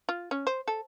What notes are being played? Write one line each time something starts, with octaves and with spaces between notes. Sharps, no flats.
F4
C#4
C5
A4